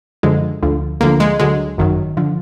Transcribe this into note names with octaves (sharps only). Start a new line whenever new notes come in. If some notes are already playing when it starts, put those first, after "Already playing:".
F#2 D3 F3 G#3
D2 D3 F3
D2 D3 F3 A#3
G#3
D2 D3 F#3 G#3
G#1 F#2 D#3 F#3
D3 F3